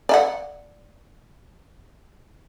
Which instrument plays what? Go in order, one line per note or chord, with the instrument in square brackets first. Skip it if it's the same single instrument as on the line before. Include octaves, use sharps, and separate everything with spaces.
[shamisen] D5 E5 F#5